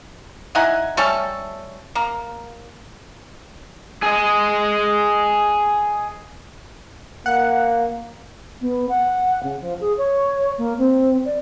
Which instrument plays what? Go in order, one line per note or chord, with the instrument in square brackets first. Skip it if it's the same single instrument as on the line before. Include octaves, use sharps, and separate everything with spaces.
[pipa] D#4 E4 F#5 G#5
G3 A3 C#4 A4
A#3
[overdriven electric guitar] G#4 D#5
[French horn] A#3 [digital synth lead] F#5
[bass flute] B3
F#5
C#3
F3
G#4
C#5
A#3
C4
D5